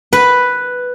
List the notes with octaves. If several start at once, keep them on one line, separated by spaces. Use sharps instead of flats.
B4